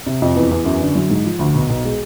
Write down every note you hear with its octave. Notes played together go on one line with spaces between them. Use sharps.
C3
F2
E2
E2
F#2
D3
F#3
G#2
F3
D2
B1
B1
G#3